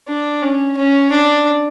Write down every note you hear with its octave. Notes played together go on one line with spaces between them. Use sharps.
D4
C#4
C#4
D4